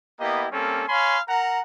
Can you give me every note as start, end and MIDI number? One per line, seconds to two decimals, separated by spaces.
0.20 0.46 58
0.20 0.46 59
0.20 0.46 64
0.20 0.46 67
0.20 0.46 75
0.51 0.82 55
0.51 0.82 58
0.51 0.82 60
0.51 0.82 61
0.51 0.82 69
0.87 1.18 73
0.87 1.18 77
0.87 1.18 80
0.87 1.18 83
0.87 1.18 84
1.28 1.60 70
1.28 1.60 78
1.28 1.60 82